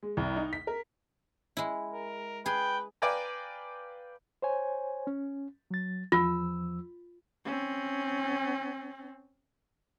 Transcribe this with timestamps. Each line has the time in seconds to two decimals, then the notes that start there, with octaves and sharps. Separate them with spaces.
0.03 G#3
0.17 C2
0.36 D#4
0.53 B6
0.67 A#4
1.57 G#3 E4
1.93 A#4
2.46 G#4 B4 G5
3.02 B4 D5 F5 G5 G#5 A#5
4.42 C5 C#5 G#5
5.07 C#4
5.71 F#3 A6
6.12 E2 F3 F4 E6
7.45 C4 C#4